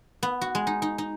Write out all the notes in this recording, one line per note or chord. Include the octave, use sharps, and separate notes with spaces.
B3
F#4
G#3
D#4
D#4
D#4